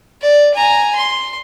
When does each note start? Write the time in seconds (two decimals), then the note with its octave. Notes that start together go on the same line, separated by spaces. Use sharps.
0.22 D5
0.55 G#5 A#5
0.95 C6